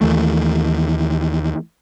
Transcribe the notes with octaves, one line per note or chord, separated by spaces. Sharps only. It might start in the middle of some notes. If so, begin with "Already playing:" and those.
D#2 E3 A3